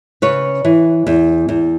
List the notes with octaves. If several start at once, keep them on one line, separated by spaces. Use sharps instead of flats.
C#3 B4 C#5
E3
E2
E2